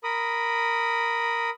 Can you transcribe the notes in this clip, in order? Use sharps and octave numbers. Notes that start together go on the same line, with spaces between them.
A#4 B5 D#6